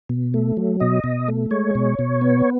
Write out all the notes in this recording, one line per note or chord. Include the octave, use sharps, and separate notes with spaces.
B2
A3
F#3
B2 D#5
B2
A3
G#3 C#5
B2
B2
B3